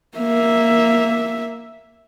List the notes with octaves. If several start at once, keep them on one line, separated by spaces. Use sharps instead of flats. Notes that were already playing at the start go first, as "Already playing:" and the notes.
A#3 E5